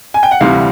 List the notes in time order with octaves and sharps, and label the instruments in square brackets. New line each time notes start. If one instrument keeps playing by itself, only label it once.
[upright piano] G#5
G5
F#5
D2 C3 E3 G3 F5